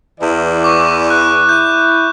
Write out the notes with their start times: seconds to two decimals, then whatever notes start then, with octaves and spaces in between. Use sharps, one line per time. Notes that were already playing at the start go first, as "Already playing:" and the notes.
0.21 E2 E3 D5
0.64 C#6 D6
1.10 F#6
1.49 E4 G6